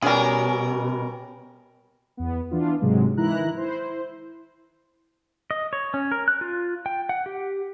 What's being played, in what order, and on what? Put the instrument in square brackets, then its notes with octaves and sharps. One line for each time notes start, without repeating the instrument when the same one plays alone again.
[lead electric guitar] B2 [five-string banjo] G3 G#4 [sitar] C#4 A#4
[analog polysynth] E2 B3
E3 B3 D4 F4
G#2 C3 F#3 G#3
D#3 E3 E4 A#5 F#6
E4 C5
[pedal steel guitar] D#5
C#5
C#4
A#4
F#6
F4
G5
F#5
G4